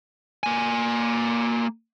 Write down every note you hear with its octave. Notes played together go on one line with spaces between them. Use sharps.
A#3 G#5